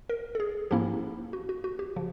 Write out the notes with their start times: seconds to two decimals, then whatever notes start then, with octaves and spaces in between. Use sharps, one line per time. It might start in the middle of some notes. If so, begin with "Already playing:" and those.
0.09 A#4
0.35 A4
0.40 G#4
0.71 G#2 F3 A#3 C#4 E4 G4
1.33 F#4
1.49 F#4
1.64 F#4
1.79 G4
1.96 C#3 F3